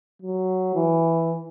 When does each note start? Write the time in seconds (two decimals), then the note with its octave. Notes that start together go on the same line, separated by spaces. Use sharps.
0.22 F#3
0.75 E3